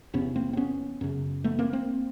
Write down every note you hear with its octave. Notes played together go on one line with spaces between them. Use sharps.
E2 C3 B3 C#4
A#3 C4
C4
B3 C#4
F#2 C#3
A3 B3
A#3 C4
A#3 C4